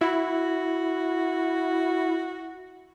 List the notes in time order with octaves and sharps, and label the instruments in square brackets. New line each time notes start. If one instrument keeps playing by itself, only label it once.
[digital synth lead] E4 [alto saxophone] F#4